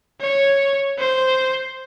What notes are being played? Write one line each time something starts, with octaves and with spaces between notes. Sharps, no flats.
C#5
C5